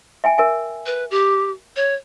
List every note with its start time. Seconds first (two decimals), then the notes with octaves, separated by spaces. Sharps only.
0.24 E5 G5 G#5
0.38 A#4 E5 G#5
0.86 B4
1.11 G4
1.76 C#5